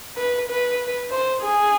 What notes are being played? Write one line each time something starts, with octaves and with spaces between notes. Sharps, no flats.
B4
B4
C5
G#4